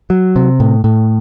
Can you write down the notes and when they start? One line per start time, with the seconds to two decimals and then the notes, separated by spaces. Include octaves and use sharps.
0.10 F#3
0.36 C3
0.60 A2
0.84 A2